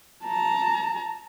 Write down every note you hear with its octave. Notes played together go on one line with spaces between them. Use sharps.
A5 A#5